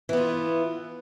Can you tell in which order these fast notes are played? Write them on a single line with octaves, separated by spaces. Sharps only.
E3 B3 F4